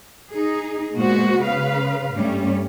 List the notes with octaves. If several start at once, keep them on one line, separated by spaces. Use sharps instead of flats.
D#4 G#4
A#2 G#3 B3 F#4 C5
C#3 B4 F5
G2 G3 A3 C#4